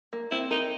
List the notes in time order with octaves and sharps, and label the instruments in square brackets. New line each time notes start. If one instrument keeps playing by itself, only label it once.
[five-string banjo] A#3
[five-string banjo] C4 [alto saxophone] E4
[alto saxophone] D#4 [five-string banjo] A#4